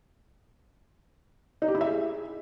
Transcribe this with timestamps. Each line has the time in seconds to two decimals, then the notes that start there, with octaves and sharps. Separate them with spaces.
1.62 D#4
1.68 G4
1.74 E4
1.81 E5
1.87 G#4